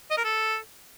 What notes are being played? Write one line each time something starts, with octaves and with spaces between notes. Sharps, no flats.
D#5
A#4
A4